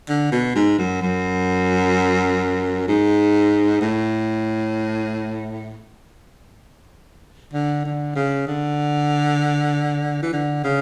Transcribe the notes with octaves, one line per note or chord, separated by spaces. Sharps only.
D3
B2
G#2
F#2
F#2
G#2
A2
D3
D3
C#3
D3
E3
D3
C#3